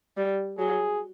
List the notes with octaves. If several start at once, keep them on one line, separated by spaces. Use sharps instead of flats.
G3
F#3 G#4